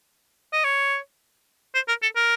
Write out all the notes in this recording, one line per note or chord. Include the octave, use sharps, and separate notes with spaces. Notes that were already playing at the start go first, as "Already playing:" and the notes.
D#5
C#5
C5
A#4
A4
A#4